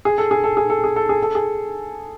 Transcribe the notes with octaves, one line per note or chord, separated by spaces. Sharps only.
G#4
A4
G#4
A4
G#4
A4
G#4
A4
G#4
A4
G#4